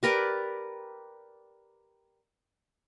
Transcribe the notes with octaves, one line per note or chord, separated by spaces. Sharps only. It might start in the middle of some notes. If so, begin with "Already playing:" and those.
G4 A#4 B4 D5